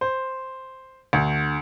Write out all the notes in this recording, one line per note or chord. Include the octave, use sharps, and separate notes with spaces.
C5
D2